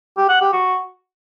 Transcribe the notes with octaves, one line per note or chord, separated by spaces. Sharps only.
G4
F#5
G4
F#4